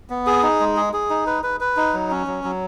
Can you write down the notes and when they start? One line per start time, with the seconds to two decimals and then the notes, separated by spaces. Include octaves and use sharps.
0.10 B3
0.27 G#4
0.43 D#4
0.60 G#3
0.77 G#4
0.93 G#4
1.10 D#4
1.27 B4
1.43 B4
1.60 B4
1.77 D#4
1.93 F#3
2.10 C#4
2.27 F#3
2.44 F#3